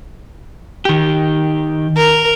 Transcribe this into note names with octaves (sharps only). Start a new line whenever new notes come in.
D#3 G4
A#4